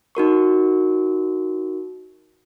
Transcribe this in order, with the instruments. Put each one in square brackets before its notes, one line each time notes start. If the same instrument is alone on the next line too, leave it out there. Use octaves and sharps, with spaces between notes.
[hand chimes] D#4 F#4 A#4 C#6